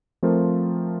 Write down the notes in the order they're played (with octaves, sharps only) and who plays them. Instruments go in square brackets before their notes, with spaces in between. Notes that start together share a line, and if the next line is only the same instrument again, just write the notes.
[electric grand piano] F3 A3 C4 F4 A#4